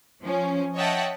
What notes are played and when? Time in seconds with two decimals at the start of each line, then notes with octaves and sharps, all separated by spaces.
0.22 F3 C#4
0.76 C#5 D#5 E5 F#5 G5 A5